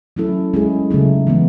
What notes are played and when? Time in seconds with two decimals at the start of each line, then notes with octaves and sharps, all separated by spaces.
0.16 F#3 A3 C#4 E4 A4
0.54 G#3 C#4 E4 G#4
0.90 C#3 F#3 A3 D#4
1.27 E3 G#3 B3